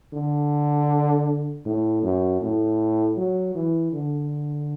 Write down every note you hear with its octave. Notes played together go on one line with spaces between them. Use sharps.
D3
A2
F#2
A2
F#3
E3
D3